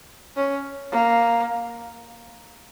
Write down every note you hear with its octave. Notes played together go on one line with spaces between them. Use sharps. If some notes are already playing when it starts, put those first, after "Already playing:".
C#4
A#3